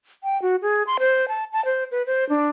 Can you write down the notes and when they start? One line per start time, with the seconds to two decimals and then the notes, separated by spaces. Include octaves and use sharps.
0.23 G5
0.42 F#4
0.62 G#4
0.87 C6
0.99 C5
1.28 A5
1.53 A5
1.65 C5
1.91 B4
2.06 C5
2.29 D4